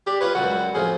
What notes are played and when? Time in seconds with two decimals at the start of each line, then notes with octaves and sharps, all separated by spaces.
0.07 D4 G4
0.21 C#4 F4 B4 C#5
0.35 C#2 F#2 G3 F#4
0.75 F2 A2 F3 G#4